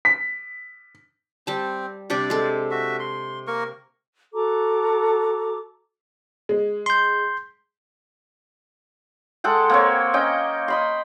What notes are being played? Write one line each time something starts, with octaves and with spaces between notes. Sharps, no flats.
B6
G3 C4 A5
C3 G3 D4 D5
G#3 A4
F#4 E5
C6
A#3 A#4 C#6
F#4 A4 A#5 D6
G#3
C6 G6
G#3 A4 F#5 G5
A#3 C4 C#5
A#3 C#4 D#5 G5
D#5 B5 C6